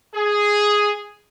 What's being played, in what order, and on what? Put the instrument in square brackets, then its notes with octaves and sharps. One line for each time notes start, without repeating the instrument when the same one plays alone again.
[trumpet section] G#4